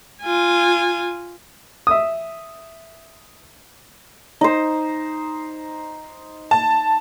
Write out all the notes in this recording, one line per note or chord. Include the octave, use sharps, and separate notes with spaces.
F4 G#5
E5 D#6
D#4 C5
A5